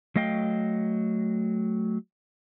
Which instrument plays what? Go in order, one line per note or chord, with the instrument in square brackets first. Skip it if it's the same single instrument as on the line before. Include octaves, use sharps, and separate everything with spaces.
[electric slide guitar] F#3 A3 D#5 F5 G5